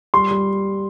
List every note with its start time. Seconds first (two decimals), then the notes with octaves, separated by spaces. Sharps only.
0.14 G3 C6
0.31 G3